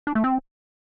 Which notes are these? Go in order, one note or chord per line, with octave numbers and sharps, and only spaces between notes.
D4
A3
C4